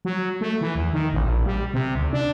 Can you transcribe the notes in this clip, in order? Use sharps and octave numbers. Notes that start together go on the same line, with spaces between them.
F#3
A3
E3
E2
D#3
A1
A#1
G3
C3
D2
D4